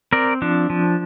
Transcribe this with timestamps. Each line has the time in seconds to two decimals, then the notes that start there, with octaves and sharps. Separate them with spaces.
0.13 C4 A#4 D5
0.42 F3 D4
0.70 F3